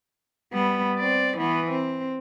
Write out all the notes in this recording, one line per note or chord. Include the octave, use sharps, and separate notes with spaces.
G3 B3
C4 D5
E3 B3
C4